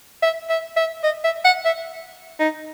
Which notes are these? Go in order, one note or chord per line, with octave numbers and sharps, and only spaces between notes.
E5
E5
E5
D#5
E5
F#5
E5
D#4